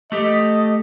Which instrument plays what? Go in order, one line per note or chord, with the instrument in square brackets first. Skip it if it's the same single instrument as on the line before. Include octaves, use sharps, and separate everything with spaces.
[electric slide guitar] A3 G4 A4 [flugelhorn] D#5